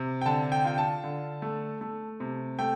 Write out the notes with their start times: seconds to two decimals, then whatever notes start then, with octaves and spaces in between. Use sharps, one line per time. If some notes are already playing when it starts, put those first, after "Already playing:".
Already playing: C3
0.21 G5
0.26 D3 A5
0.52 G5
0.65 F4 G5
0.78 A5
1.04 D3
1.42 A3
1.81 A3
2.20 C3
2.59 A3 G5